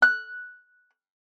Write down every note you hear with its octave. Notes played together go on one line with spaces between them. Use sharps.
F#6